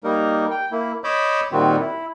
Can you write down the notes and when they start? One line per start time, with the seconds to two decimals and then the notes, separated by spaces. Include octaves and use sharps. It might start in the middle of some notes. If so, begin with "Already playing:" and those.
0.04 G3 A#3 D#4 A#4
0.51 G5
0.72 A#3 E4
1.04 C#5 D#5 B5 D6 E6 G6
1.52 A#2 D#3 G3 C4 F4 F#4
1.80 E4